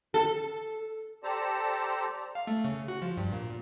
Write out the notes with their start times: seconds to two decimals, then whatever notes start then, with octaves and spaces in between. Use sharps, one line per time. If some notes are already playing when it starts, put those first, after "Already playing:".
0.14 A4
1.23 G4 A4 C5 D5 A5 A#5
2.35 F5
2.47 A3
2.64 C#3
2.88 F#4
3.02 F3
3.17 G2
3.32 A#2